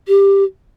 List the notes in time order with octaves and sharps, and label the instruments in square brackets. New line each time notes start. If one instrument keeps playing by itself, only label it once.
[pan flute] G4